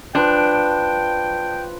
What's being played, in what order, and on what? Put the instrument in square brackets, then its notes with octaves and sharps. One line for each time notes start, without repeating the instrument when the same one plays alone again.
[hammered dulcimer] F3 B4 [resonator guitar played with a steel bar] D4 [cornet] G5